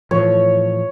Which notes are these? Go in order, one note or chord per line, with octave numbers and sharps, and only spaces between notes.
A2 E3 F3 C#5